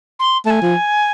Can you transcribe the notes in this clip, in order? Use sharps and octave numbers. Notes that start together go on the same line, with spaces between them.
C6
A3 G#5 A5
F3